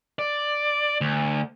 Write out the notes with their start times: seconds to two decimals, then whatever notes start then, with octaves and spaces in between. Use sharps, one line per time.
0.19 D5
1.01 D2